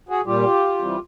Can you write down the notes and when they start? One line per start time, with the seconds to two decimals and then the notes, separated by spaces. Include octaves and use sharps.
0.09 F#4 G#4
0.26 A#2 G3 F4 G4
0.78 C3 E3 G3